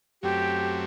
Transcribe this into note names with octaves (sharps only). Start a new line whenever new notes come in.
F#2 F#3 A3 C4 G4